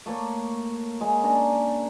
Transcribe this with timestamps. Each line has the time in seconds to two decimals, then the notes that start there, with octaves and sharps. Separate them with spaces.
0.06 A3 A#3 C#5
1.01 G#3 A#3
1.24 C#4 D4 A#4